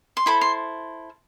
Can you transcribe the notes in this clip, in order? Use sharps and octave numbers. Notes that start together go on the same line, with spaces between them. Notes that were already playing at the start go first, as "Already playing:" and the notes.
C6
E4 A4 C5 B5
C6